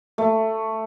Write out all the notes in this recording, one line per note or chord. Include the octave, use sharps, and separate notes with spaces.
A3